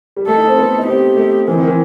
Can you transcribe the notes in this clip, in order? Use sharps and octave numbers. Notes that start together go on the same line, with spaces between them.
G3
A3 A4
D#4
C4
B3
D#4
C4 G4
A3
E3 C4
D#3
E3